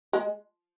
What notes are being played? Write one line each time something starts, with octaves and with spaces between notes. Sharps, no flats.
G#3